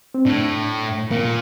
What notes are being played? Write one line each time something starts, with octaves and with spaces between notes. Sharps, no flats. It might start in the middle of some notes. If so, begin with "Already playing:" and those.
C4
A2 D4
A#2 A#3